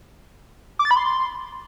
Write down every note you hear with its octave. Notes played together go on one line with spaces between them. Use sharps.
D6
A6
B5
C6